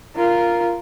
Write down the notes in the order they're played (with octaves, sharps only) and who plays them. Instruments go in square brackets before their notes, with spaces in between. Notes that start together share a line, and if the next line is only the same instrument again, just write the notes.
[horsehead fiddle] F4 A#4